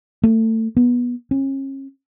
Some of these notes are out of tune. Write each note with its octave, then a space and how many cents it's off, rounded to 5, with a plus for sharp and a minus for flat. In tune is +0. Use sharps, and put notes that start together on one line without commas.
A3 +25
B3 -20
C#4 -35